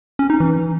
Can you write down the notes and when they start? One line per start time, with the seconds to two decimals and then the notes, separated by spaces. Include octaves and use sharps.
0.19 C#4
0.30 D#4
0.40 E3